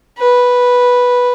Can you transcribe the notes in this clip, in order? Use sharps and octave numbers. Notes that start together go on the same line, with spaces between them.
B4